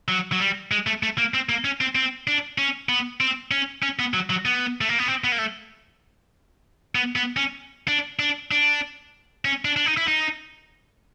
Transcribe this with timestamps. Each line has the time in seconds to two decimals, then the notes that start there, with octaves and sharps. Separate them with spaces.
0.08 F#3
0.32 F#3
0.40 G3
0.71 G#3
0.87 A3
1.03 A3
1.18 A#3
1.34 C4
1.49 A#3
1.65 C#4
1.81 C4
1.95 C4
2.28 D4
2.58 C#4
2.89 B3
3.21 C4
3.51 C#4
3.82 C#4
3.99 B3
4.14 F#3
4.30 F#3
4.46 B3
4.81 A3
4.89 A#3
4.99 B3
5.08 C4
5.24 B3
5.32 A#3
5.38 A3
6.95 B3
7.16 B3
7.37 C#4
7.88 D4
8.19 D4
8.51 D4
9.45 C#4
9.65 D4
9.76 D4
9.86 D#4
9.98 E4
10.08 D#4